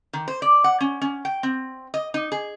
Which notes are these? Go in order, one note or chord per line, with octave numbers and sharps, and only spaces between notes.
D#3
C5
D5
F#5
C#4
C#4
G5
C4
D#5
D#4
G#4